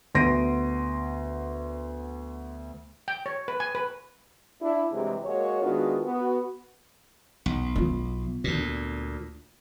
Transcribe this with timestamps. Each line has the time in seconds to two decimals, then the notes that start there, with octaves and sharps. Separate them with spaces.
0.15 D2 B3 C6 A#6 D7 D#7
3.08 G5
3.26 C#5
3.48 B4
3.60 G#5
3.75 B4
4.61 D4 E4
4.92 G2 C3 E3 F#3 G#3
5.24 G#3 A#3 F#4 C#5
5.62 D#3 G#3 B3 D4 F4 F#4
6.05 B3 F#4
7.46 B1
7.76 B3 F4
8.44 D2 A#2